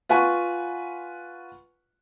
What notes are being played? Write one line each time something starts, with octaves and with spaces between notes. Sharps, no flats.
F4 B4 F#5 G#5 C#6